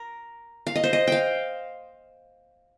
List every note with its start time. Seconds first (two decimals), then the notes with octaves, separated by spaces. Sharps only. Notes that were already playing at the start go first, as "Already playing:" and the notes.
Already playing: A#4
0.67 F5
0.76 D#5
0.84 C5
0.93 D#5
1.07 F5 G5